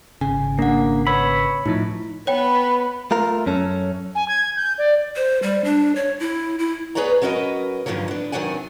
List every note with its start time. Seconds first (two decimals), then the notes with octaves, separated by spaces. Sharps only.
0.21 G#1 C#3 G#5
0.59 A#3 D4 F#5
1.07 B4 C#5 B5 E6
1.66 A2 F3 D#4 E4
2.27 B3 B4 C#5 G5 B5
3.11 A3 F4 A#4
3.46 F#2 C#4 A4
4.15 G#5
4.28 G#6
4.56 G6
4.78 D5
5.16 C5
5.43 G3
5.64 D4
5.96 C#5
6.20 E4
6.59 E4
6.95 B3 G#4 B4 C#5 D5 A#5
7.22 F#3 C#4 F#4 A#4 B4 D#5
7.86 G2 A#2 D3 D#3 F3 F#3
8.08 B3 D4
8.32 C3 D#3 F#3 D4 F#5 G#5